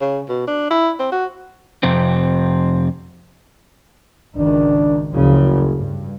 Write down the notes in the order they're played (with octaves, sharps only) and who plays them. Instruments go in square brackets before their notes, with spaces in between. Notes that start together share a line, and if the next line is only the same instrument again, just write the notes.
[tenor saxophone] C#3
B2
D4
E4
C4
F#4
[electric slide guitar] F2 C3 C4
[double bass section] G#1 C#2 D#3 [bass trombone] D4
[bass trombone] F#1 [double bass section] D2 C#3 F3
[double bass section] G2